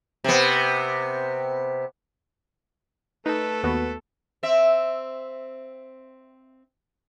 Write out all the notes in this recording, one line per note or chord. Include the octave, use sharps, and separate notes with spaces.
C3 B3
A3 D#4 A4 B4
D#2 B3 F#4 B4
C4 E5